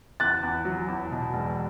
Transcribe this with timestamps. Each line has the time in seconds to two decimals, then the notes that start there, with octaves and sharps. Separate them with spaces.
0.20 E2 F#6 A6
0.43 E2
0.65 F#3
0.88 E2
1.11 B2
1.34 E1